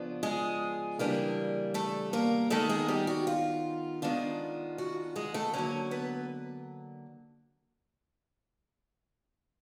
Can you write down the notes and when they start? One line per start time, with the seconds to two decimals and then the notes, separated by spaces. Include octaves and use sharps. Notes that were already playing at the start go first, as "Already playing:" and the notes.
Already playing: C#3 F3 B3 D4
0.23 G#3 G#4
0.99 C#3 E3 G3 A#3 D4
1.74 A3 A4
2.13 A#3 A#4
2.50 D#3 G#3 A3 B3 A4
2.69 G#3 G#4
2.88 G3 G4
3.07 F#4
3.27 F4
4.02 D#3 G#3 B3 D4 F4
4.78 F#4
5.16 G#3 G#4
5.34 A3 A4
5.53 D3 F#3 A#3 C#4 C#5
5.91 B3 B4